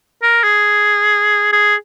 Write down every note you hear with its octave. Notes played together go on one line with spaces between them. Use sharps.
A#4
G#4
G#4